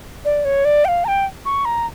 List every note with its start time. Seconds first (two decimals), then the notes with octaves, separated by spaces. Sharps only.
0.25 D5
0.45 C#5
0.65 D5
0.85 G5
0.88 F5
1.04 A#5
1.08 G5
1.45 C#6
1.65 A#5